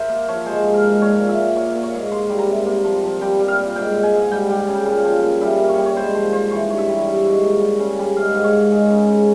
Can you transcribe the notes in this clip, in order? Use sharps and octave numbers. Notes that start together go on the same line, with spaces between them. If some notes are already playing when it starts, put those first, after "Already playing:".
Already playing: A#4 C5 E5
A#3
F3 C#5
G#3 C5
G#2
A#4
G#2
A#2 C#5
A#2
E5
A#2
A#3 C#5
A#3
C#5
G#2
A#3 C6
G3
A#5
C3
A#3
F3
F3
G3 G5
G3
F5
A#2
G#2 G5
G#2
G#5
G#2
G3 G5
G3
C#3
A#2
F3
A#2
G3 E5
A#3
C#5
G3
C#5
G#2 C5
F3 C5
F3 C5
E3 C#5
G2 C#5
E5
G3
G3
G#2
A#3
G3
C#3
G3
G#2 F5
G#2
C#5
G#2
G#3
C#3
C#3